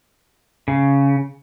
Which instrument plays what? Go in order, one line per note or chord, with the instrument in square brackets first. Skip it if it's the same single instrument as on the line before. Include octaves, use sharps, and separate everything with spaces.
[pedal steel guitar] C#3